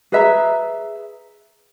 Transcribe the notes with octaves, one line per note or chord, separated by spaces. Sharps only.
G#4 B4 E5 A#5